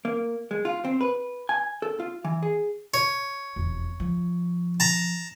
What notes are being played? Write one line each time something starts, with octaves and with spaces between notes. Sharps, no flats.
A#3
G#3
F4
C4
B4
G#5
A4
F4
E3
G#4
C#5
E1 F2
F3
A5 A#5